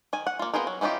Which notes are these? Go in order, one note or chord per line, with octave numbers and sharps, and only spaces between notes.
D#3 G#5
F#5
A#3 F4
B3 C4 F4 G#4 A#4
F#3
E3 C#4 D#4 F4 G4